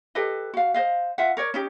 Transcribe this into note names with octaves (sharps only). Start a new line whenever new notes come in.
G4 A4 B4 D#5
F#4 F5
C5 D#5 F5
F4 E5 F#5
A#4 C#5 D5
C#4 D#4 G4